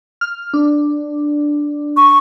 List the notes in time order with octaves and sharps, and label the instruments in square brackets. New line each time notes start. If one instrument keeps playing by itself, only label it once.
[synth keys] F6
D4
[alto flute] C#6